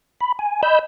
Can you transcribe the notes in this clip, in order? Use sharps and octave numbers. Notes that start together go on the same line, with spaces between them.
B5
G#5
D#5 B5 E6 G6